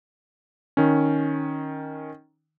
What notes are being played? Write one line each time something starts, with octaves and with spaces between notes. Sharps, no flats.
D#3 C#4